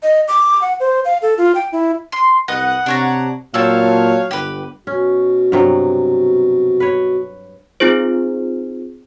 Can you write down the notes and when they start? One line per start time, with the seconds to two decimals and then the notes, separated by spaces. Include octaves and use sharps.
0.03 D#5
0.28 D6
0.62 F#5
0.80 C5
1.05 F5
1.22 A4
1.38 F4
1.55 G5
1.72 E4
2.12 C6
2.48 C2 B4 D#5 F#5
2.86 C3 D4 C#5 A#5
3.54 A#2 F#3 C4 C#5 F5 A5 E6
4.31 G1 G4 B4
4.87 B2 C#4
5.52 G2 C3 F#3
6.80 B4 C#5
7.80 C4 D#4 F4 G#4 C5